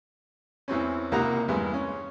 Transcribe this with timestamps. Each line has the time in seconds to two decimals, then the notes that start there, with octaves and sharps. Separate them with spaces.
0.68 E2 E3 C4 C#4
1.12 C#2 C3 A#3 D#4 F#5 A#5
1.48 E2 G2 G#3 B3
1.74 C#4